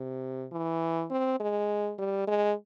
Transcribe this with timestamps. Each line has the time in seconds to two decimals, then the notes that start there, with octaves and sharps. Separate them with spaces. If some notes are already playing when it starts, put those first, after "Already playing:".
Already playing: C3
0.52 E3
1.11 C4
1.40 G#3
1.98 G3
2.27 G#3